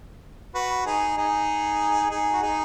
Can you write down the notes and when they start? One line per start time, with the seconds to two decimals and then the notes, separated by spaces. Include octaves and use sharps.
0.54 F#4 B4
0.86 D#4 G#4
1.17 D#4 G#4
2.11 D#4 G#4
2.33 F#4
2.42 D#4 G#4